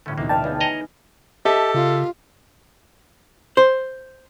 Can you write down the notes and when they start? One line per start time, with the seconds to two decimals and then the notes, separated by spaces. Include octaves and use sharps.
0.06 A#1 A2 D3 A3 C#4
0.18 D2 B2 E3 A#3 D4 D#4
0.29 A#4 B4 D5 G5 A5 F6
0.44 C#2 B3 D#4 G#4
0.61 C#5 D#5 A#5
1.45 G4 A4 D#5 E5 A5
1.74 C#3 F4
3.57 C5